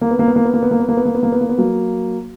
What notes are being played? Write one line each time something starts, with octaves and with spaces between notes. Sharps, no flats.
A#3
B3
A#3
B3
A#3
B3
A#3
B3
A#3
B3
A#3
B3
A#3
B3
A#3
B3
A#3
B3
F#3 A#3